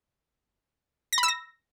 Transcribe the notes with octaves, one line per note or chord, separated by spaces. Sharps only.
A#6
B5
E6
A#6